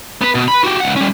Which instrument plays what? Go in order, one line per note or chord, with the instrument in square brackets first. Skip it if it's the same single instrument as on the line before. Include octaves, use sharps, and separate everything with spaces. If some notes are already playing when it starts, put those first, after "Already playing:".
[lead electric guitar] B3 B4
B2
B4 B5
F#4 G4
C#2 F#5
G3 C#4